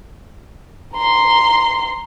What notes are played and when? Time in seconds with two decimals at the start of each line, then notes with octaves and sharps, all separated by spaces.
0.94 A#5 C6